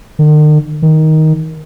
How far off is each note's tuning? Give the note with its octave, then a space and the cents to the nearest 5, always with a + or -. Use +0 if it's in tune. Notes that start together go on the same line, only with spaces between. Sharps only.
D#3 -45
D#3 +10